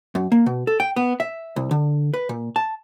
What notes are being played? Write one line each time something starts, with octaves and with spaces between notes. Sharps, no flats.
F#2
A#3
B2
A4
G5
B3
E5
C2
D3
B4
A#2
A5